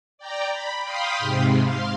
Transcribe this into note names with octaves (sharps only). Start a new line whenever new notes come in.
D5 G5 A#5
B5
F5 G5 B5 C6 D#6
G#2 C3
F5 C6